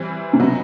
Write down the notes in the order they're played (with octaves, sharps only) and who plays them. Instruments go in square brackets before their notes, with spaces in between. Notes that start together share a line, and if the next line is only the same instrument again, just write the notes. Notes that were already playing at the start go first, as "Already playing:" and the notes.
Already playing: [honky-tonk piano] E3 G3 C4
[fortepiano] C3
[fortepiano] B2 [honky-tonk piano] F#3 B3 D#4